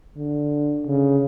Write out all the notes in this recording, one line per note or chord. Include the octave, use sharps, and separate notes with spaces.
D3
C#3